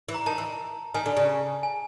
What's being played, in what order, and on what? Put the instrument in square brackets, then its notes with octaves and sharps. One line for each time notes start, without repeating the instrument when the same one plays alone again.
[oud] E3
[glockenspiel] A#5
[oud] D#3 [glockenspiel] A5
[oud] E3
[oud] D#3 [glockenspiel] G#5
[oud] D3
C#3
[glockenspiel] G#5